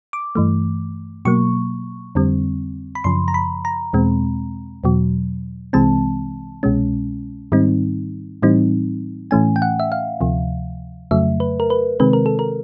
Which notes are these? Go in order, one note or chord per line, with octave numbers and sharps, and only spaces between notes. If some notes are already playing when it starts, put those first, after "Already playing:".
D6
G2 E3 A3
B2 F#3 A#3 C#6
F2 D3 G3 C4
B5
F#2 C#3 F3 C6
A#5
B5
A#5
E2 B2 G#3 C4
E2 B2 F#3
C2 C3 E3 G#3 C4 A5
C2 B2 G#3 C#4
G#2 D#3 G3 C4 D#4
A2 E3 G3 C4 D#4
A2 E3 A3 C#4 G#5
G5
F#5
E5
F5
D2 C3 F3
F2 C#3 F#3 A3 E5
B4
A#4
B4
C3 D#3 G#3 C4 B4
A#4
A4
A#4